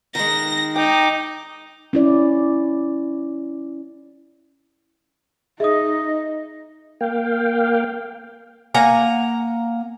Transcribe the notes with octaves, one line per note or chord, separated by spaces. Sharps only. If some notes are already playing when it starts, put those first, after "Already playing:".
D#3 G#3 A#6
D#4 G5 D6
C#4 E4 D5
D#4 G#4 D#5 E5 D#6
A#3 F5 G5
A#3 F#5 G#5 A#5